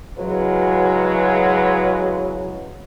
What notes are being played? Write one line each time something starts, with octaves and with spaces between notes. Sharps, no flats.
C#3 E3 F#3 G#3 F#4 B4